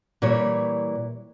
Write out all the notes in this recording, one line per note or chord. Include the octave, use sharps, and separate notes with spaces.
A#2 E3 G3 C#5